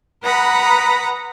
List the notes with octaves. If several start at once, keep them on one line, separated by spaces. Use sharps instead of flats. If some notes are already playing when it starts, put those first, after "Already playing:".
B4 F#5 A#5 B5 D#6